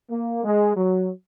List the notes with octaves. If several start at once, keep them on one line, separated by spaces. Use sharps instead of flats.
A#3
G#3
F#3